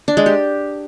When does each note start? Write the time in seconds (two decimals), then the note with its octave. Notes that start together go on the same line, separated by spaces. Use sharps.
0.08 D4
0.17 G#3
0.26 G4